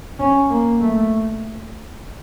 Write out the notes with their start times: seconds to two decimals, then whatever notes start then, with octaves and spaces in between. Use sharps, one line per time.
0.19 C#4
0.50 A#3
0.81 A3